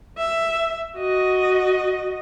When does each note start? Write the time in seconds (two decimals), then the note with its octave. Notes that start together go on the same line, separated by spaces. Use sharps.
0.18 E5
0.97 F#4 D#5